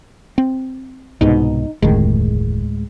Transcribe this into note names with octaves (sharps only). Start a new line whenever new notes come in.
C4
C2 G#2 B2 D#4
F1 D2 A2 D#3 G#3